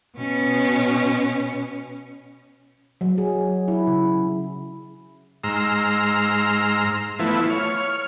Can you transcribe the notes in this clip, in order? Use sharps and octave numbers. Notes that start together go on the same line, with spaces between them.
B2 C#4
F#3
G#4
E4
C#3
G#2 A#5 C6 E6 F6
E3 F3 A3 B3 E4
C#5 F6